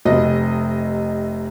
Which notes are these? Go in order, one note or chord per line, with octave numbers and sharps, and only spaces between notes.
F1 C3 D#5